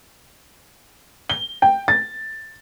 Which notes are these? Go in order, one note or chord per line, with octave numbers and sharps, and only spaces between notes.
G7
G5
A6